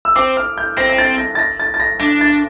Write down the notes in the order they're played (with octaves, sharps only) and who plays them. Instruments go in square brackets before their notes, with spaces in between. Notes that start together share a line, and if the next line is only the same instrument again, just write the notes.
[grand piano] E6
[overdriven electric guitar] C4 [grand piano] D6
[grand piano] F6
G6
[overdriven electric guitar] C4 [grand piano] A#6
[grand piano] A#6
A6
A#6
A6
A#6
A6
A6
A#6
[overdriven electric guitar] D4 [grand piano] A#6
[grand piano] A6